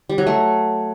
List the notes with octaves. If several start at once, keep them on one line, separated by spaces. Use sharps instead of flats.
G3
F#3
A3